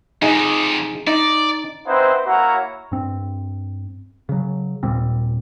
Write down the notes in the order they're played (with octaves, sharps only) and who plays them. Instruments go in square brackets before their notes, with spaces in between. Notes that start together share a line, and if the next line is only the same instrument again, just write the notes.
[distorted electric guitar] F2 C3 [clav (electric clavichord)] D#4 G#4 D#5
[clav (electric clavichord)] D#4 [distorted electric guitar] D5
[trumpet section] C4 D#4 E4 B4 C5 F#5
A#3 E4 F#4 C#5 F#5 A#5
[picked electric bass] G2 C4
C#3 F#3
D#2 A#2 G3 C4